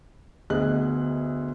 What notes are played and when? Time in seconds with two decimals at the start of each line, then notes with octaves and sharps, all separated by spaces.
0.50 D2 B3 G#4 D#5 F#6